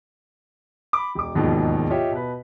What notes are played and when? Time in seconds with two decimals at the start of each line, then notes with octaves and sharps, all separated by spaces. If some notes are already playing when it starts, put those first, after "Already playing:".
0.93 B5 D6
1.15 E1 D6
1.35 E1 D#2 G#2 B2 D#3 F3
1.90 F4 G4 C#5 D#5 E5
2.11 B2 B4